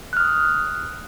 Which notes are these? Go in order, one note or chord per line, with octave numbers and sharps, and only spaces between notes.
D#6 F6 F#6